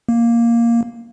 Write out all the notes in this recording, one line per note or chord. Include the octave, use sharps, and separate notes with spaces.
A#3